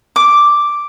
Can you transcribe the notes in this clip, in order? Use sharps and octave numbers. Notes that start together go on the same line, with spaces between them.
D6